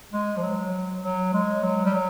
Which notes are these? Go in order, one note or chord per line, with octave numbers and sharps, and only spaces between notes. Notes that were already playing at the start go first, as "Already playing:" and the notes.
G#3
F3
F#3
F#3
G#3
F#3
G3
F#3